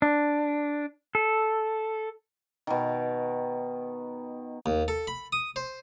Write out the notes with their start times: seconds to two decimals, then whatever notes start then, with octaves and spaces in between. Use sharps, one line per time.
0.02 D4
1.15 A4
2.67 B2 D#3
4.66 D#2
4.88 A4
5.07 B5
5.32 D#6
5.56 C5